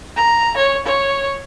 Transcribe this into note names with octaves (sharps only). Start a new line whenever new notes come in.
A#5
C#5
C#5